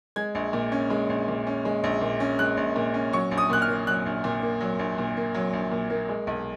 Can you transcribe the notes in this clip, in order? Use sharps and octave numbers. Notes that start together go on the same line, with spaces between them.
G#3 G#6
A#1
A#2
C#4
G#3
A#1
A#2
C#4
G#3
A#1
A#2
C#4
G#3 F#6
A#1
A#2
C#4
F#3 C#6
A#1
D#6
A#2 F#6
F6
A#3
F#3 F#6
A#1
A#2
A#3
F#3
A#1
A#2
A#3
F#3
A#1
A#2
A#3
G#3
B1